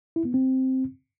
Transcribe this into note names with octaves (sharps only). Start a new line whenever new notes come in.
E4
B3
C4